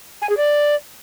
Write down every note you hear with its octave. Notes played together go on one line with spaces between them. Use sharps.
G#5
G#4
D5